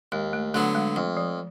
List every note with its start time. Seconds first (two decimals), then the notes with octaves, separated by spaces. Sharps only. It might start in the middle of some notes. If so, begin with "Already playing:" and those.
0.12 D#2 G#3
0.33 A3
0.54 D3 F#3 A3 B3
0.75 G#3
0.96 F2
1.17 F3